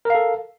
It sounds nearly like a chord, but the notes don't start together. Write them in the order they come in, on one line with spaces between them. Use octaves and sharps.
A#4 F5 A4